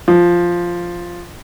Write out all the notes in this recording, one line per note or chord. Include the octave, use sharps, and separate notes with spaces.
F3